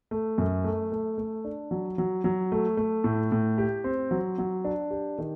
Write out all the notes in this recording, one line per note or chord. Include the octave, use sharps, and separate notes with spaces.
A3
F#2
A3
A3
A3
D4
F#3
F#3
F#3
A3
A3
A2
A2
G4
C4
F#3
F#3
D4
G4
D#3